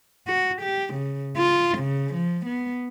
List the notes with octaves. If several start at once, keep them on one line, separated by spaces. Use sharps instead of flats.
F#4
G4
C#3
F4
C#3
F3
B3